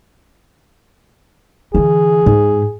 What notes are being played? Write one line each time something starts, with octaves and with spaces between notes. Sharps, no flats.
D3 E3 G#4
G#2